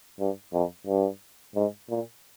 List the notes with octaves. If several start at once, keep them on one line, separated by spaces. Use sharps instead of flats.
G2
F2
G2
G#2
A#2